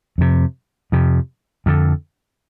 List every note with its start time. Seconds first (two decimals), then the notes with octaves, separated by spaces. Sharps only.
0.18 F2 C3
0.92 F2 C3
1.66 F2 D3